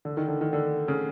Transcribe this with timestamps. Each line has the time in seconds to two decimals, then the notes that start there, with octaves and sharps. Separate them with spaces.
0.05 D3
0.17 D#3
0.28 D3
0.41 D#3
0.53 D3
0.88 C#3